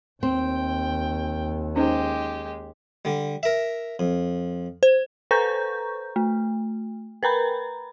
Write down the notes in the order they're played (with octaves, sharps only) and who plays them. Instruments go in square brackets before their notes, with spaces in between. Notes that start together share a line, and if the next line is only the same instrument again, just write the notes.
[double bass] D#2 [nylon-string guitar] C4 [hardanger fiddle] G5
[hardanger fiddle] G#3 G4 [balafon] C#4 D#4 C5
[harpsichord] D3 G3
A#4 E5
F2
[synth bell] C5
A4 B4 C5 A#5 C#6 G6
A3
A#4 B4 A#5 B5